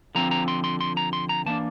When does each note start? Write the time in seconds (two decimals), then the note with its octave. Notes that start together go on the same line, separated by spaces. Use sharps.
0.15 D3 F3 C4 A#5
0.31 A#5
0.48 C6
0.64 C6
0.81 C6
0.97 A#5
1.13 C6
1.29 A#5
1.46 E3 A#3 D4 A5